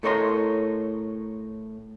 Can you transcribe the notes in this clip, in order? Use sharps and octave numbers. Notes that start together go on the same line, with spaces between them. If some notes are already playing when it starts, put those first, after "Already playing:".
A2 A4 A#4 C#5 D#5 C6